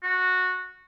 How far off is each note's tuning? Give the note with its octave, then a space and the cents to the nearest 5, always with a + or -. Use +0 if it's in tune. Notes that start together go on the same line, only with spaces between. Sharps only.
F#4 -10